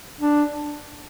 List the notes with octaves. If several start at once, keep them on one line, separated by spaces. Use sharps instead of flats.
D4